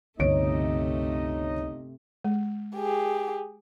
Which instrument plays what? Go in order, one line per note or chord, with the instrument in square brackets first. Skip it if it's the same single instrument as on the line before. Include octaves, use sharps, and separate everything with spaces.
[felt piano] G1 C#5 D7 [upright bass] C#2 [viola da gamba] C3 A3 [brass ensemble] D#4 D#5
[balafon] G#3
[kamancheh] G4 G#4